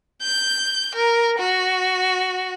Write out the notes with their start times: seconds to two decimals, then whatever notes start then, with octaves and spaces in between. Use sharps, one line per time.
0.22 G6
0.95 A#4
1.39 F#4